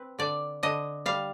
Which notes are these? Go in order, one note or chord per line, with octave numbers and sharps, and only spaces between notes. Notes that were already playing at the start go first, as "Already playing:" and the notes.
Already playing: C4 B4
D3 D5
D3 D#5
G3 F5